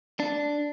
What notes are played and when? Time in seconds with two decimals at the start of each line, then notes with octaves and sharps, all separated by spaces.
0.20 D4